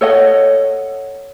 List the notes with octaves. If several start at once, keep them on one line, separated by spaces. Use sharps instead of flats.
A4 C#5 D#5 F#5